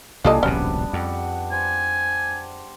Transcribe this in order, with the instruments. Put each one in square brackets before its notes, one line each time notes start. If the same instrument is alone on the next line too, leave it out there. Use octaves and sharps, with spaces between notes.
[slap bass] C2 A#3 [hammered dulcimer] G3 D4 G#4 [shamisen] F4 A4 D#5
[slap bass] D1 A#1 C3 [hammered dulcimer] G3 B3 [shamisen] C#4
[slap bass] F2 [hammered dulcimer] F#5 G5
[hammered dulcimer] C5 [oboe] G#5